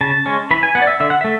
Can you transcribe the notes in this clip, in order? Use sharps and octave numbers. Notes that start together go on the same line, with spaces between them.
C#3 A5
G#3 C#4
E3 B5
G#5
B3 F#5
D5
E5
D3 E5
F#5
A3 E5